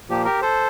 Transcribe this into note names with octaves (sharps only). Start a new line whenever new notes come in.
A#2 F3 A#3 G4
G4 A#4
A4 C5